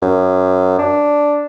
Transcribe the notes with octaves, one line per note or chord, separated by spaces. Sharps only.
F#2
D4